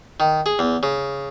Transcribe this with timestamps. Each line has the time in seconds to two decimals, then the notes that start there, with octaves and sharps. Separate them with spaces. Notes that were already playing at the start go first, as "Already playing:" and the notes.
0.20 D#3
0.46 G#4
0.59 E2
0.83 C#3